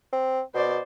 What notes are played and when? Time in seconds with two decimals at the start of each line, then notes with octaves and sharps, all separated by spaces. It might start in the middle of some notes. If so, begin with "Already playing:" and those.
0.13 C4
0.54 B2 C5 D5